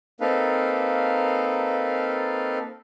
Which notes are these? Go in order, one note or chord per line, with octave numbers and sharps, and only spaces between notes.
A#3 C4 D#4 A4 B4 F5